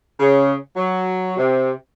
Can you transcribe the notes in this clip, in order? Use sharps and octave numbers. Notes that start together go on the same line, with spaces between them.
C#3
F#3
C3